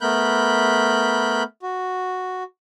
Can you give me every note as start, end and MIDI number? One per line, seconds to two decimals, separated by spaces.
0.01 1.43 57
0.01 1.43 59
0.01 1.43 70
0.01 1.43 83
0.01 1.43 90
0.01 1.43 91
1.62 2.43 66